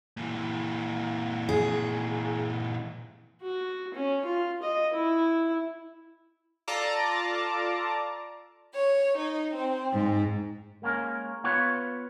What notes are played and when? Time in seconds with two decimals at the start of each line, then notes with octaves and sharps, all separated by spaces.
0.17 A#2 E3
1.49 G#4
3.42 F#4
3.94 C#4
4.25 F4
4.62 D#5
4.93 E4
6.68 F4 A4 D5 A5 A#5 D6
8.74 C#5
9.17 D#4
9.54 C4
9.93 G#2
10.82 G#3 A#3 C#4 A#4
11.44 B3 F4 B4 C#5